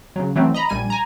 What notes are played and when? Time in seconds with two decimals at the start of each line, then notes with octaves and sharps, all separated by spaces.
0.16 C#3 F#3
0.36 E3 F#3 A3 C4
0.54 D#5 A#5 B5
0.69 A#1 G3 G#5 D#7
0.90 G#5 A#5